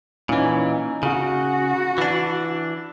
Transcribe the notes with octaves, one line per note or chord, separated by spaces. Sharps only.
A#2 E3 C#4 D#4
C#3 F#4
E3 D4